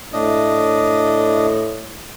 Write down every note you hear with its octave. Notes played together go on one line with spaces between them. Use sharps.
A2 D4 D#5